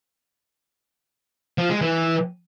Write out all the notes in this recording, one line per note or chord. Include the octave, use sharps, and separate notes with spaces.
F3
G#3
E3